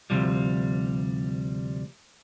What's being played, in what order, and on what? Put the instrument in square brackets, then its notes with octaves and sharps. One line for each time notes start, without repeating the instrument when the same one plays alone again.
[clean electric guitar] D2 G2 C3 F3 G3